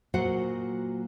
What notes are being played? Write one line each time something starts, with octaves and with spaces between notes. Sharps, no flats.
A#2 F#3 F#4 C5 F#5